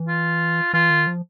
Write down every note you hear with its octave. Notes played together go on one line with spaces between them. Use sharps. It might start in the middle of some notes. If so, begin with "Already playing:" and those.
Already playing: E3
F4
E3 F4
D#3
F3